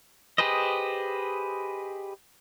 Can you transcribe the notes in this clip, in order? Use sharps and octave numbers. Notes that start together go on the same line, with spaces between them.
G4 G#4 B4 C5 D#5